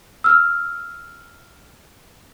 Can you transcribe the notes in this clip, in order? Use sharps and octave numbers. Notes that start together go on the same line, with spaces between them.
E6 F6